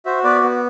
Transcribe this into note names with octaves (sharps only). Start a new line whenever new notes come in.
F#4 C5 E5
B3 B4 D5
B3